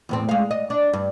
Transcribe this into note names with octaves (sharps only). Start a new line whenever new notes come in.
E2 A2 C4
G#3 F5
D#5
D4
G2